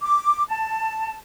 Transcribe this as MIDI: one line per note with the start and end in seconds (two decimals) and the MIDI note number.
0.01 0.43 86
0.50 1.16 81